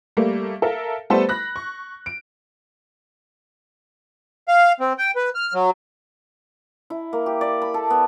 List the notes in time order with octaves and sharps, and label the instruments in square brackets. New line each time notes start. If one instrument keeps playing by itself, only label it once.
[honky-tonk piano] G3 A3 A#3
A4 A#4 E5 F5
G3 A3 B3 A4 B4 C5
B5 F#6 A#6
C#6
D7
[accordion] F5
C4
G5
B4
F6
F#3
[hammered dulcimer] E4
A#3
G4
D5
B5
A4
B3